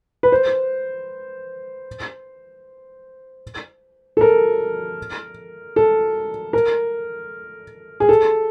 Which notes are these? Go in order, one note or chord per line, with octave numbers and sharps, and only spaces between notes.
B4
C5
A4
A#4
A4
A#4
G#4
A4